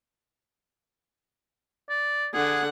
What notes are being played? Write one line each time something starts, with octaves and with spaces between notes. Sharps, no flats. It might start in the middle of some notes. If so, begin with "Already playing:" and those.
D5
D3 G#4 F#5